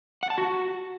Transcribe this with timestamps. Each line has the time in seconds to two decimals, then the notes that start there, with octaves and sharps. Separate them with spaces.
0.23 F#5
0.30 A5
0.38 F#4